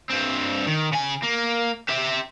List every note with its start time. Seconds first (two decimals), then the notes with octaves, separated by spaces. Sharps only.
0.10 G2 C4
0.67 D#3
0.92 C#3 G#5
1.23 A#3
1.90 G4 E5